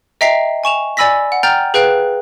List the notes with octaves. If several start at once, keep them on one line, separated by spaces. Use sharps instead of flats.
D#5 E5 G5 A#5 B6 C7
G#5 C#6 E7 F7
D5 G#5 B5 E6 A#6 B6
F#5
G5 A#5 F6 G6 A6
G#4 B4 F5 G5 F#6